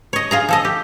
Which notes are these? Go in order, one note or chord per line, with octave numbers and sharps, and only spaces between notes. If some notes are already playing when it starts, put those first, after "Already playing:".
C#5 D#5
F4 G#4 A#5
F3 A4 D#5
G4